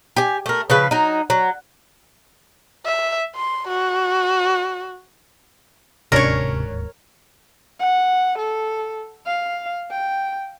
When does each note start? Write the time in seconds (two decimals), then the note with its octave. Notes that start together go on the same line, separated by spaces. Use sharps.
0.16 G4 G#5
0.46 A3 A#4
0.70 C#3 F3 B4
0.91 F#3 D#4
1.30 F#3
2.85 E5
3.36 C6
3.68 F#4
6.12 D1 D#2 G#2 C3 C#4 D4 A#4 C#5
7.80 F#5
8.38 A4
9.26 F5
9.90 G5